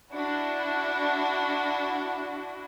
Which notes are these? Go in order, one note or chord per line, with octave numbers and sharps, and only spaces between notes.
D4 E4 F#4